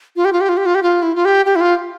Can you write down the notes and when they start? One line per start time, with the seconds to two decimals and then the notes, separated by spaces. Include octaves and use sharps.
0.16 F4
0.25 G4
0.33 F4
0.41 G4
0.49 F4
0.57 G4
0.66 F4
0.75 G4
0.83 F4
1.02 E4
1.15 F4
1.25 G4
1.46 G4
1.56 E4
1.61 F4